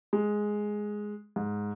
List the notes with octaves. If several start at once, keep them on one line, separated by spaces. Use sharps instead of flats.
G#3
G#2